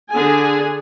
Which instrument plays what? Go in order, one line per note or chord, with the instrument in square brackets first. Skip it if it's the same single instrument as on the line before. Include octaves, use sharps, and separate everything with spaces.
[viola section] D3 G#4 G#5